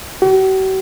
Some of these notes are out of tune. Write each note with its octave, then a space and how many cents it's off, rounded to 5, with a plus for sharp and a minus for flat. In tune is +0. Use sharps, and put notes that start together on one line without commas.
F#4 +45